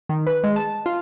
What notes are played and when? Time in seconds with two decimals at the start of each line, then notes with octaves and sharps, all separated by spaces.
0.09 D#3
0.27 B4
0.44 G#3
0.56 A5
0.86 F4